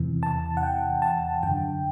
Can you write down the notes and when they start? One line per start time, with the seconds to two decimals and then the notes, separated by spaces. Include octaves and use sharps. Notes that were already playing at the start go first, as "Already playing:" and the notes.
Already playing: E2 C3 E3
0.23 A5
0.57 F#5
0.63 G5
1.02 A5
1.43 F#2 D3 G5